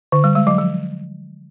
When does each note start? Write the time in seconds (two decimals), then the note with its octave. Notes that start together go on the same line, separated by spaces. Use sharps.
0.12 D3
0.24 G3
0.35 G#3
0.47 F#3
0.58 F3